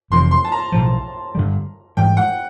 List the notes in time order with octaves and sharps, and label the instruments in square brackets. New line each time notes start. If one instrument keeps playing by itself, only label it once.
[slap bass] F1 F2 C3 E3 [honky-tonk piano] C6
[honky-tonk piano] C6
A5
A#5
[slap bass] B1 A2 F3
G2 D3 G3
[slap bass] G#2 E3 G3 [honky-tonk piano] G5
[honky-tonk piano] F#5